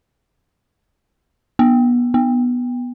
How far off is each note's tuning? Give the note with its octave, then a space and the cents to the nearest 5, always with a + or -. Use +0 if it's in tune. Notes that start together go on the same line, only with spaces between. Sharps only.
B3 -25
B3 -5